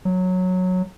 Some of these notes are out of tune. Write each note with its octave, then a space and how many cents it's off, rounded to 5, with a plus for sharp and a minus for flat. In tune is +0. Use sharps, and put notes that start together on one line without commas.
F#3 -10